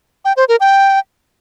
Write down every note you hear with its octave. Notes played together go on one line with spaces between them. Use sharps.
G5
C5
A#4
G5